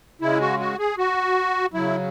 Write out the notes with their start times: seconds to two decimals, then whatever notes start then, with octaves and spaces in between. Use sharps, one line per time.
0.21 C#3 G#3 E4
0.41 F#4
0.59 F#4
0.78 G#4
0.98 F#4
1.73 C#3 F#3 E4